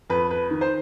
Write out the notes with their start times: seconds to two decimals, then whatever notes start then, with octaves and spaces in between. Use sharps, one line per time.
0.10 F2 B4
0.31 B4
0.51 D#3
0.61 C5